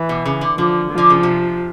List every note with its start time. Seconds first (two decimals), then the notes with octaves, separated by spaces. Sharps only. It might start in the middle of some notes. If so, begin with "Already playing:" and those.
Already playing: E3
0.09 B2
0.25 C#3
0.41 D3
0.58 D3 F3
0.91 F3
0.98 D3
1.10 C#3
1.23 C3